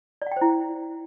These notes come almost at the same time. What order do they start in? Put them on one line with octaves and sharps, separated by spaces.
D5 F#5 G5 C5 E4